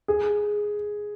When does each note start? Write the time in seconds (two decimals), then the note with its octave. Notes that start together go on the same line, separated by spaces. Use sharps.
0.08 G#4